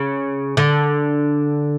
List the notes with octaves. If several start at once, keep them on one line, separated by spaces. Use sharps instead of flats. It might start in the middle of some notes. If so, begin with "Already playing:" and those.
Already playing: C#3
D3